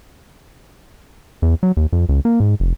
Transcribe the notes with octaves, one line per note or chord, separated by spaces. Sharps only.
E2
F#3
D#2
F2
C#2
A#3
G#2
F1